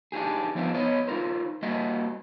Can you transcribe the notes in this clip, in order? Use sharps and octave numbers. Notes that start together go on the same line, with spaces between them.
D4 D#4 G4 G#4
F3 B3 C4 D#4 E5
B3 C#5 D#5
D#4 F4 A#4 C5
G3 A#3 F#4 D#5 E5 F#5